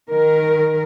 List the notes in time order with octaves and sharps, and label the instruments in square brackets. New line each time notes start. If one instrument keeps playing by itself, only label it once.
[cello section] D#3 A#4